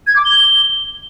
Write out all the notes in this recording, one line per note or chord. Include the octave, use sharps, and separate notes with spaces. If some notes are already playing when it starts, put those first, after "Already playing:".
G#6
D6
G7